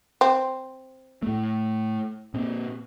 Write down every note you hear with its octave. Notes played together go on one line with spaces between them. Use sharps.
C4
A2 A3
A#2 C4